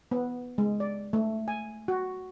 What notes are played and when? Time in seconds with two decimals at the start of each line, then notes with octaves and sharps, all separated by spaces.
0.11 B3
0.58 G#3
0.80 D5
1.13 A3
1.48 G#5
1.88 F#4